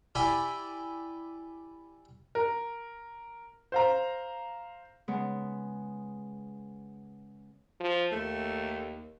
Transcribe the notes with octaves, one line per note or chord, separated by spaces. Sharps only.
E4 G4 D5 E5 G#5 B5
A#4
C5 F5 A#5
C#3 G#3 B3
F3
D#2 A3